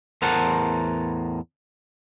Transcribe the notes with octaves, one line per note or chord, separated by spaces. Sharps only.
E2 A2 A#4 C5 F#5 A5